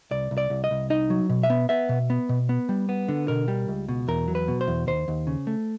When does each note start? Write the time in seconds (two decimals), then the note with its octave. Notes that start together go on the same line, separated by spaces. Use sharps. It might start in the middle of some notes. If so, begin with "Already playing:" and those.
0.11 C2 D5
0.31 C2
0.38 D5
0.50 C2
0.64 D#5
0.71 C2
0.90 D#4 D#5
1.10 F#3
1.30 B2
1.43 E5
1.50 B3
1.69 B3 E5
1.89 B2
2.10 B3
2.29 B2
2.49 B3
2.69 G3
2.89 B3
3.08 D3
3.28 B2 A#4
3.48 G3
3.68 C#2
3.88 B2
4.08 E2 A#4
4.28 F#3
4.35 B4
4.48 B2
4.61 C5
4.67 E2
4.87 D#2 C5
5.08 D#2
5.27 C#3
5.47 A3